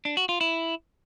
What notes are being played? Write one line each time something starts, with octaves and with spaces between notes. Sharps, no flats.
D4
F#4
F4
E4